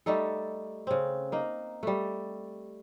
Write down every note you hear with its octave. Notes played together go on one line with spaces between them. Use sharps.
G3 A3 D#4 A4
C#3 C4
A#3 D#4
G3 A3